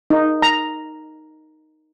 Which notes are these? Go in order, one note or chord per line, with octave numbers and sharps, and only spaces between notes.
D#4
A#5